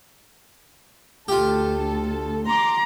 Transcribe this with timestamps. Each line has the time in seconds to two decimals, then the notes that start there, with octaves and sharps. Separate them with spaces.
1.28 D2 F4 G4 A4
2.47 A#5 C6 D6